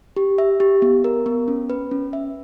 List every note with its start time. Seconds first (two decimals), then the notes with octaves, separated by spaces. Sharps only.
0.16 G4
0.38 E5
0.60 G4
0.82 B3
1.04 A#4
1.26 B3
1.48 C#4
1.70 B4
1.91 C#4
2.13 E5